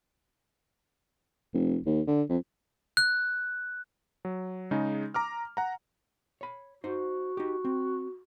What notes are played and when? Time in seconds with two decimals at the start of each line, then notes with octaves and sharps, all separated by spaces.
1.54 F1
1.86 D#2
2.07 D3
2.29 F2
2.97 F#6
4.25 F#3
4.71 C#3 G#3 D#4
5.14 A#5 D6 F6
5.57 F#5 A#5
6.41 C#5 B5
6.84 D#4 F#4 C5
7.37 D#4 G4
7.65 C4